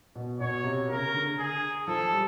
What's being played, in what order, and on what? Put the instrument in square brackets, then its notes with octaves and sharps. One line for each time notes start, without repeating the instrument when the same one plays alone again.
[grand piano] B2
[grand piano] B2 [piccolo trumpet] C#5
[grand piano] C3
[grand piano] C#3 [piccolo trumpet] A#4
[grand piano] D3
[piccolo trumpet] G#4
[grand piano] F3 [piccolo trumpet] A4
[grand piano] G3